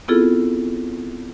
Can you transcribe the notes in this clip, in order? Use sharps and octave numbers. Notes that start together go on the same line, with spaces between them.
B3 C4 E4 F4 G#4 A4